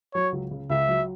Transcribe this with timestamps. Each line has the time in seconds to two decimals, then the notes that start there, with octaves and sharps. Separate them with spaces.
0.14 F#3 C#5
0.32 C#2
0.51 C#3
0.70 C#2 E5
0.88 F#3